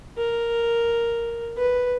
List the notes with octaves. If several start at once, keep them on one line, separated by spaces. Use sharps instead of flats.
A#4
B4